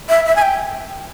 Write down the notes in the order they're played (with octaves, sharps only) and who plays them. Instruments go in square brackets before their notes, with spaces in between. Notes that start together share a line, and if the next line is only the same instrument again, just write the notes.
[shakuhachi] E5
E5
G#5
G5